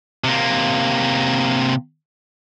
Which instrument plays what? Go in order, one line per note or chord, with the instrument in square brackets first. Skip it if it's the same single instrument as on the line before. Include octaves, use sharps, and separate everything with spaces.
[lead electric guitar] C3 A#3